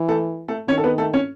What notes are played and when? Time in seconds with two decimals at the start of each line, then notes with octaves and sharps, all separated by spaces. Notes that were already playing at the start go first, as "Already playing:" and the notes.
Already playing: E3
0.08 A3 A4
0.48 A3 A4
0.68 D#3 C#4 C#5
0.78 A4
0.84 B3 B4
0.98 A3 A4
1.13 C#4 C#5